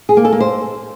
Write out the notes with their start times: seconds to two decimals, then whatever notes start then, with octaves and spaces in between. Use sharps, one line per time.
0.09 G#4
0.17 A#3
0.25 A4
0.33 A#3
0.40 C5